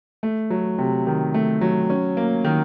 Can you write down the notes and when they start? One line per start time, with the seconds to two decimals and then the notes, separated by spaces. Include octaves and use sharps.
0.23 A3
0.50 F#3
0.78 C3
1.07 D#3
1.34 A3
1.61 F#3
1.90 C#4
2.17 A#3
2.44 D#3